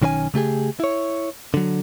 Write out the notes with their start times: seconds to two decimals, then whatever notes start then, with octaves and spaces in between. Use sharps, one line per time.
0.02 B1 D#3 C#4 B4 G#5
0.34 C#3 A3 G4 G#4
0.80 E4 C#5
1.54 D3 F#3